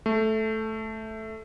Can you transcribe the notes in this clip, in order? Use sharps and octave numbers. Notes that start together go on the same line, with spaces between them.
A3